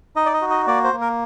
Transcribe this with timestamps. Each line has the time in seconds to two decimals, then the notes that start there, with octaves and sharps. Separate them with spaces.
0.16 D#4 D#5
0.26 D5
0.34 D#5
0.41 F#4
0.50 D#5
0.67 A#3 D5
0.84 C5
0.93 A#3
1.01 A#4